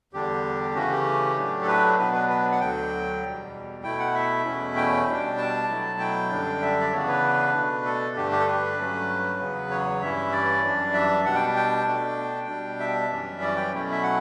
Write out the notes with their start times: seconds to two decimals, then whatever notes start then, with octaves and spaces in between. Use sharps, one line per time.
0.13 E2 D3 G3 D4 G4
0.75 C#3 E3 A3 C#4 F#4
0.91 G4
1.37 A2 F#3 A3 D4
1.62 A4
1.67 B4
1.99 B2 F#3 B3 D4 B4
2.13 B4
2.29 B4
2.52 F#5
2.60 D2 D3 F#3 G5
3.22 E2 B2 G3
3.83 B2 A3 E4 G5
3.99 F#5
4.15 E5
4.45 E2 B2 A3 C#4 E4
4.76 G5
5.07 B2 G3 D4
5.38 A5
5.69 B2 F#3 A3 E4
5.99 G5
6.30 F#2 D3 G3 D4
6.62 E5
6.81 D5
6.92 C#3 E3 B3 D4 C#5
7.08 B4
7.55 B2 A3 D4
7.85 A4
8.16 G2 D3 A3 D4 G4
8.32 G4
8.40 A4
8.47 B4
8.78 G2 F#3 A3 C#4
9.40 E2 C#3 F#3 B3
9.70 C#5
10.01 G2 E3 G3 C#4 E4 E5
10.32 D5
10.63 F#2 E3 G3 D4
10.94 E5
11.25 B2 G3 D4 F#5
11.35 G5
11.56 G5
11.87 B2 A3 D4
12.48 B2 G3 D4
12.80 E5
13.10 F#2 E3 G3 C#4
13.41 D5
13.56 G5
13.72 B2 F#3 A3 C#4 E4
13.91 E5
14.03 F#5